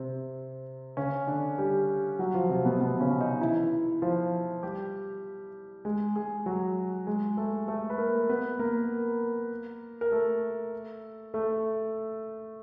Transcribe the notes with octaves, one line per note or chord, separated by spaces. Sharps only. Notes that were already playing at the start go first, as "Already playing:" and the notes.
Already playing: C3 C4
C#3 C#4
D3 D4
G3 G4
F#3 F#4
F3 F4
C3 C4
B2 B3
B2 B3
C#3 C#4
D#3 D#4
E3 E4
F3 F4
G3 G4
G#3 G#4
G#3 G#4
F#3 F#4
G#3 G#4
A3 A4
A3 A4
B4
A#3 A#4
B3 B4
A#3 A#4
A#4
A3 A4
A3 A4